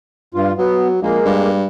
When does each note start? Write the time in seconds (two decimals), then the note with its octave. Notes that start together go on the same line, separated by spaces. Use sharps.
0.34 G2 F4
0.58 F#3 B3
1.02 A#1 G#3 A#3
1.25 G2